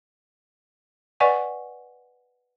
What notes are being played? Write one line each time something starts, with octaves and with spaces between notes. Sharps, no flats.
B4 D5 D#5 F#5 G#5 C#6